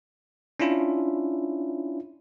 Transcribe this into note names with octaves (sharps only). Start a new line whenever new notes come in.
C#4 D4 E4 F4